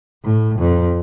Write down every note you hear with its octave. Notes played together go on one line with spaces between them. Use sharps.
A2
F2